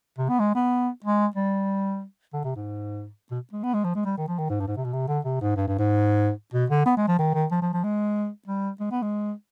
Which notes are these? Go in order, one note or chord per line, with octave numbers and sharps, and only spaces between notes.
C3
B3
G#3
B3
G#3
G3
D3
C3
G#2
B2
G#3
B3
G#3
F3
G#3
G3
D#3
F3
D#3
G#2
G2
G#2
C3
B2
C3
D3
C3
G#2
G2
G2
G#2
B2
D3
B3
G#3
F3
D#3
D#3
F3
F3
F3
G#3
G3
G#3
B3
G#3